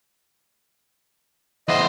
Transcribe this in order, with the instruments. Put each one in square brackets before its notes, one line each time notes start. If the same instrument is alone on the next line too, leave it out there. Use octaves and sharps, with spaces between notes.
[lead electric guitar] E2 C5 [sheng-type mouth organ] D#5